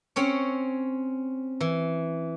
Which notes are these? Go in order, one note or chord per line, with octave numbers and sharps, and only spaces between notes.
C4 C#4 C#5
E3